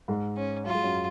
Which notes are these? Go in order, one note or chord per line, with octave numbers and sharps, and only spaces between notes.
G#2 G#3
C#4
F#3 F4
G#3
F#2 F#3